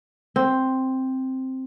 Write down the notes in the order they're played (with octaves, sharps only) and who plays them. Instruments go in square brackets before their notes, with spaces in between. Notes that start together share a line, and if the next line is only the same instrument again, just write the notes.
[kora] C4